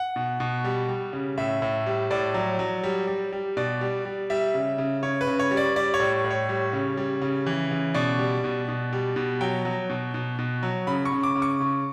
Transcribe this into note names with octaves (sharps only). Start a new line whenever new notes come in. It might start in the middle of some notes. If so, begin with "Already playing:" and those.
Already playing: F#5
B2
B2
G3
G3
C#3
A2 E5
A2
G3
A2 D5
F#3
F#3
G3
G3
G3
B2 D5
G3
G3
G3 E5
C#3
C#3
C#3 C#5
B4
C#3
C#5
G3
D5
G3 D5
C#5
A2
A2
C#5
G3
C#3
G3
C#3
E3
C#3
B2 D5
G3
B2
B2
G3
B2
F#3 G5
F#3
B2
B2
B2
F#3
C#3 B5
C#6
C#3
D6
C#3
C#6
C#3